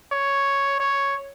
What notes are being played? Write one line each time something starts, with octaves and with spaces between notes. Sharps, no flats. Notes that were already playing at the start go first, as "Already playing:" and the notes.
C#5
C#5